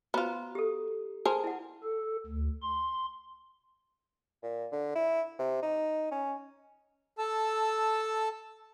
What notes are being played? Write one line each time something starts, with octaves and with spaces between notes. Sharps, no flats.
B3 F4 F#4 C5 A#5
G4 A4
G#4 A#4 C5 A5
E4 F#5
A4
D2
C6
A#2
D3
E4
C3
D#4
C#4
A4 A5 E6